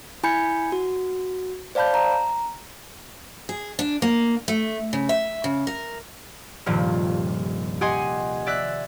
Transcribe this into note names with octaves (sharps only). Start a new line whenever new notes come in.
E4 G#5 B5 G6 G#6 C#7
F#4
C5 D5 F5 A5 B5 G6
A#5
G#4
D4
A#3
A3
C#3
E5
C#3
A#4
D#1 G2 C3 F3
G4 D#5 F#5 G#5 C6
D5 E5 F#6